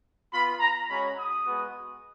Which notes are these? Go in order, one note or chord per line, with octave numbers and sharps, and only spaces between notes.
B3 F4 B5
A#5
G#3 C#4 F#4 B5
D#6
G#3 B3 F#4